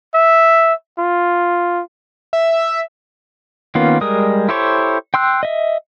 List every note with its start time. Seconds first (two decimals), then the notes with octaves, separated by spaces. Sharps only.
0.14 E5
0.98 F4
2.33 E5
3.75 D#3 A#3 B3 C#4 F4
4.01 G3 G#3 A#4 D#6
4.49 E4 G4 A4 C5 C#5
5.14 G5 C6 E6 F#6
5.43 D#5 E5